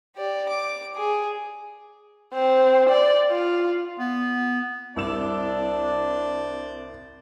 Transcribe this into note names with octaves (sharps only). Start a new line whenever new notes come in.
G4 D5
D6
G#4
C4
D5
F4
B3
C2 D4 C5 D5 E6 E7